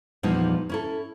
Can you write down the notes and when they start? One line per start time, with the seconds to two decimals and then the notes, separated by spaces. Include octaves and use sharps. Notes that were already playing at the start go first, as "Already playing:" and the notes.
0.23 E2 A#2 F3 G3 D#4
0.69 C#4 E4 A4